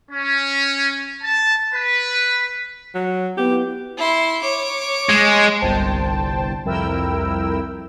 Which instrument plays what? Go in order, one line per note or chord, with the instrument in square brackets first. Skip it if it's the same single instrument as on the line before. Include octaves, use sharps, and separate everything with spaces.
[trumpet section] C#4
A5
B4
[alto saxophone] F#3
[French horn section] B3 E4 [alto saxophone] G4
[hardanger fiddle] E4 C6
C#5 D6
[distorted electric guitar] G#3
[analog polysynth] G1 C2 C5 G5 A5
C2 F2 E4 A#4 G5 E6